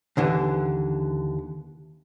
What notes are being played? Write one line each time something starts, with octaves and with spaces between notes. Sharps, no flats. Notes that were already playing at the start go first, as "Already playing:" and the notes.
D#2 D3 E3